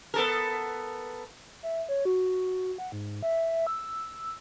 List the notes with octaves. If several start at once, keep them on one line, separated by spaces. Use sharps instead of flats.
B3 A4 A#4
E5
C#5
F#4
F#5
G#2
E5
E6